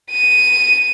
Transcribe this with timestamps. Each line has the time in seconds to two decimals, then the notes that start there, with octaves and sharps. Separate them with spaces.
0.11 D#7